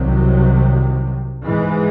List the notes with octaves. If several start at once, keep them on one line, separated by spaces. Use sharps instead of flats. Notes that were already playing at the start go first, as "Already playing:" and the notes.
Already playing: C2 C3 D#3 F#3
G#2 E3 G#3